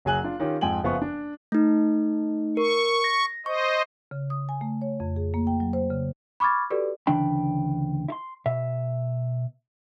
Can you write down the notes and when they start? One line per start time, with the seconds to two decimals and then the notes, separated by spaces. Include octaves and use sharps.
0.05 F#1 F#3 G#4 G#5 F#6 F#7
0.24 D4 F4
0.40 D#3 C#4 F4 G4
0.61 F2 G#2 G5 G#5 F#7
0.83 F#1 C#3 F3 B3 E5 C#6
1.02 D4
1.52 A3 D#4
2.57 A#4 C#6
3.04 A#6
3.46 C5 D#5 C#6
4.11 C#3
4.30 D#6
4.49 G#5
4.61 A3
4.82 C#5
5.00 F2
5.16 G#4
5.34 A#3
5.47 G5
5.60 F#3
5.73 C5
5.90 C#3
6.40 B5 C#6 D6 F6 G#6 A6
6.70 F#4 G4 A4 B4 D5
7.07 D2 C#3 E3 D4 G5 B5
8.08 E4 C6
8.46 B2 E5